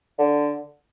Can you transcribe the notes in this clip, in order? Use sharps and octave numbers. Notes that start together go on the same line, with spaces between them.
D3